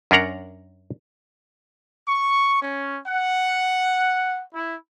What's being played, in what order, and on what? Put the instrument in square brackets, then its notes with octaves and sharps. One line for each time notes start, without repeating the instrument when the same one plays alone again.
[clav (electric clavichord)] F#2 C#4 D4 A#4 F#5 A#5
[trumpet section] C#6
C#4
F#5
E4